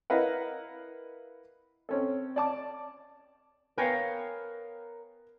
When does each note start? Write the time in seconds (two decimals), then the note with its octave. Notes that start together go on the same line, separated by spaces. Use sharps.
0.10 E4 A#4 B4 D#5 F5 F#5
1.89 C4 C#4 A4
2.36 D5 A5 D6
3.78 B3 A#4 C#5 F5 G5 G#5